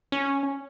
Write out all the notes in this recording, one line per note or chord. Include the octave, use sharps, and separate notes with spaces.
C#4